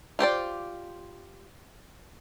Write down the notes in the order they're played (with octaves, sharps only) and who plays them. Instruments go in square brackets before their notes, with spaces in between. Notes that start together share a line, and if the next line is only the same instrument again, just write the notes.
[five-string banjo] F4 G4 C5 D5